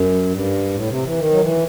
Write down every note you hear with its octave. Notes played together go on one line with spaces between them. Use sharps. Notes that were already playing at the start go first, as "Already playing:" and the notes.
Already playing: F#2
G2
A2
C3
E3
D#3
F#3
E3